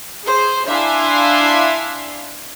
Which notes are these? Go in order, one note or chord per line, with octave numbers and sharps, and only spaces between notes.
G#4 C5
D4 E4 E5 F5 G#5 C6